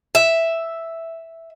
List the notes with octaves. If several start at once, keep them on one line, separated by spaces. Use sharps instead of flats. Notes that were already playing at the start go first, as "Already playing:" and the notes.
E5